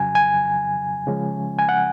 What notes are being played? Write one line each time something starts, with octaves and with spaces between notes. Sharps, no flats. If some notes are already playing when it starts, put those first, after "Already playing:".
Already playing: F2 C#3 F#3 G#5
G#5
C#3 F3 G#3 C#4
G#5
F#5